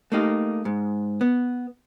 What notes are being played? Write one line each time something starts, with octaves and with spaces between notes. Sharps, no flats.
A3 A#3 D#4 G4
G#2
B3